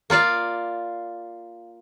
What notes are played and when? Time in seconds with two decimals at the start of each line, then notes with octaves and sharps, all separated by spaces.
0.10 A#3 F4 D5 F5